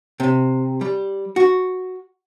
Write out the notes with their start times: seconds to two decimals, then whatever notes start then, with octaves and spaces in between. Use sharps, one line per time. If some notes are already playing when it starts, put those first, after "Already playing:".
0.20 C3
0.81 G3
1.36 F#4